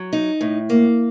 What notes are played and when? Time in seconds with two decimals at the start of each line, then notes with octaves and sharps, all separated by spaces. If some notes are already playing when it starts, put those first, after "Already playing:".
Already playing: F#3
0.13 D#4
0.41 A2
0.70 A#3